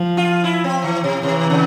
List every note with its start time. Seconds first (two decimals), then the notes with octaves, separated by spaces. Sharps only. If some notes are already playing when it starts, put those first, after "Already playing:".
Already playing: F3
0.17 F4
0.44 E4
0.64 C4
0.84 E3
1.04 C3
1.23 C3 E3
1.50 C#3